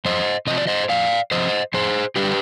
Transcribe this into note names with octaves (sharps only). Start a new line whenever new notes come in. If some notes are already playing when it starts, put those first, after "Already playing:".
F2 C5 D#5
C3 F3 D#5
D5
C5 D#5
F2 D5 F5
C3 F3 C5 D#5
F2 G#4 C5
D3 G3 G4 B4